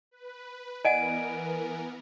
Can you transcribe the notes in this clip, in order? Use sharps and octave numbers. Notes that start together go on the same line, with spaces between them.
B4
E3 B3 A#4 D5 D#5 F#5 G#5 D7